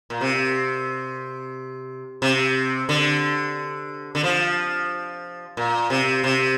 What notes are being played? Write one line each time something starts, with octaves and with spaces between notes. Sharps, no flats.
A#2
C3
C3
D3
D3
F3
A#2
C3
C3